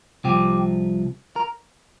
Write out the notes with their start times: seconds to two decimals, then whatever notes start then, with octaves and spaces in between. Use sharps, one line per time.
0.24 C2 C3 F3 G4
1.36 A#4